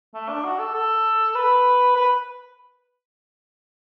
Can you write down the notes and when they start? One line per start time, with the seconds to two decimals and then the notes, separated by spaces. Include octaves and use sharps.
0.14 A3
0.29 D4
0.44 F#4
0.59 A4
0.74 A4
1.35 B4
1.96 B4